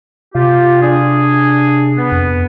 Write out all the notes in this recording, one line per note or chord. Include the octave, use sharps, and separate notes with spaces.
C3 F4 G4
D4 G#4
B3
F2